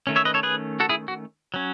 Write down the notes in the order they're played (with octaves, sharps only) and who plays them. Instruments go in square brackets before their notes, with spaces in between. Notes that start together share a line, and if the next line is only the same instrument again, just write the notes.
[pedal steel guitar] D#3 A3 C#4
C#5 E5
B4 D#5
A4 C#5
G#4 B4
F#4 A4
E4 G#4
F#4
F#3 C#4